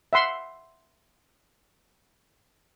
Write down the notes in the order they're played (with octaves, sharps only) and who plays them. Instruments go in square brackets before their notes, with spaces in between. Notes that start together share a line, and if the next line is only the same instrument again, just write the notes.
[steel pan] E5 F#5 C6